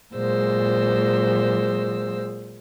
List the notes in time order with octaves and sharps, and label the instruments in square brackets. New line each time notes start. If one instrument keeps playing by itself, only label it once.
[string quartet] A#2 F#3 G#3 C5 E6